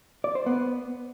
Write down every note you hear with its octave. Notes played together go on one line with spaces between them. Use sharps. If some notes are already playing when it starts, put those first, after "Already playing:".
D5
C5
B3